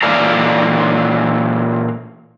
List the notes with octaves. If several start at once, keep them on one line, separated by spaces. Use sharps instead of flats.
A#2 E3 A4 D5 F5 A#5